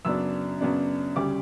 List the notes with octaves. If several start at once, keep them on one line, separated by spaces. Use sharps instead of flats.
F#2 C#3 F#3 B3 D4 E6
F#2 C#3 F#3 B3 D4
D2 C#3 G3 D6